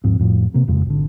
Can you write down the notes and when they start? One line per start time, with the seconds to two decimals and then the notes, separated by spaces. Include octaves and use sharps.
0.04 D#2 G#2 F3 C4
0.19 F2 A2 F3
0.54 C3 A#3
0.68 D#1 F2 C#3 G#3
0.86 G#1 D3